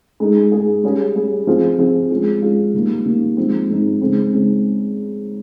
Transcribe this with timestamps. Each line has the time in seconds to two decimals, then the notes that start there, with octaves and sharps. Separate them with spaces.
0.20 G#3 D#4 G#4
0.52 G#3 D#4 G#4
0.83 G3 C#4 G#4
1.15 G3 C#4 G#4
1.47 F3 C4 F4 G#4
1.78 F3 C4 F4 G#4
2.10 G#3 C#4 F4 G#4
2.42 G#3 C#4 F4 G#4
2.74 D#3 G3 A#3
3.05 D#3 G3 A#3
3.37 F3 G#3 C4 D#4
3.69 F3 G#3 C4 D#4
4.01 C#3 G#3 C4 D#4
4.32 C#3 G#3 C4 D#4